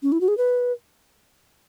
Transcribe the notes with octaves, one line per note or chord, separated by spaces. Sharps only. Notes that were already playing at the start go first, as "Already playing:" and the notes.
C#4
E4
F#4
G#4
B4